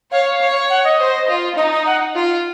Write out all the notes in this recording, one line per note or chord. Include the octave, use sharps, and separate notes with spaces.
C#5 F5
C#5
F#5
D#5
C5
F4
D#4 D#5
D#5
F#5
F4